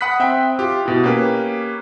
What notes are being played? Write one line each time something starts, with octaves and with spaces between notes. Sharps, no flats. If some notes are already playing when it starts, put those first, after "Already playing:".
F#5 B5 D#6 F#6 B6
C4 E5 G5
F4 G4
B2 E4
A#3 C#4 G4 B4